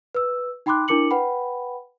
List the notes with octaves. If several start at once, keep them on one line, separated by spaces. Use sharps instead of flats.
B4 E6
D#4 G5 B5 C6 D6 F#6
D4 E4 A#4 D6 C#7 F#7
B4 F#5 G5 B5